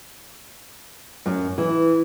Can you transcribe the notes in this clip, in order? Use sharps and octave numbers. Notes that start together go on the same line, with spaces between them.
F#2
E3